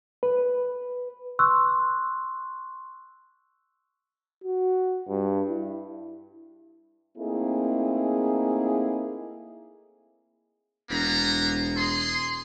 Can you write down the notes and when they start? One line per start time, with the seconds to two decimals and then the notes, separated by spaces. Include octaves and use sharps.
0.23 B4
1.39 C6 C#6 E6 F#6
4.44 F#4
5.08 G2
5.49 E4
7.18 A3 A#3 C4 D#4 E4 G#4
10.91 E1 A#3 B3 A#5
11.77 G#4 C6